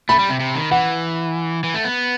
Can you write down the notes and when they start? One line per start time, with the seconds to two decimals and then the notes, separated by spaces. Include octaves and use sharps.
0.09 A3 B5
0.19 G3
0.29 C3
0.40 C3
0.55 D#3
0.71 E3 F#5
1.64 E3
1.74 A3
1.84 B3